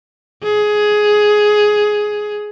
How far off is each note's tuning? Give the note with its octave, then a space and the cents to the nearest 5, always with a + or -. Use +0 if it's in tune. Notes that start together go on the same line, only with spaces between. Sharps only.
G#4 +10